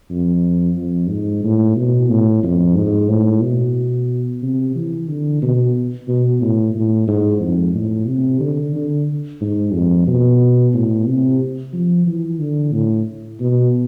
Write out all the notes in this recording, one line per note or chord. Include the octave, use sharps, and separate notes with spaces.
F2
F2
G#2
A2
B2
A2
F2
G#2
A2
B2
C3
E3
D3
B2
B2
A2
A2
G#2
F2
A2
C3
D3
D3
G#2
F2
B2
A2
C3
F3
E3
D3
A2
B2